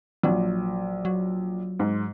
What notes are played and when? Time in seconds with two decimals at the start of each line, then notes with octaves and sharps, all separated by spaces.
0.23 A#1 F#3
1.05 F#3
1.80 G#2